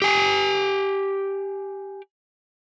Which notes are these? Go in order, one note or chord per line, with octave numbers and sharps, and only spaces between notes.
G4 G#5